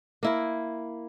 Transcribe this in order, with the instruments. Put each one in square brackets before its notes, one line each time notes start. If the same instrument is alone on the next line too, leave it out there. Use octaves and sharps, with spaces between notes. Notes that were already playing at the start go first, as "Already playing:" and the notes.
[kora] A#3 E4 A#4